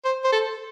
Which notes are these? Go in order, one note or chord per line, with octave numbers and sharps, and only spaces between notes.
C5
C5
A4